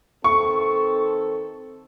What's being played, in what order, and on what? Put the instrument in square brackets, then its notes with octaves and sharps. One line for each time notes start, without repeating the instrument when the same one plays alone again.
[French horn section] D#3 C4 A4 [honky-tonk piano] C#6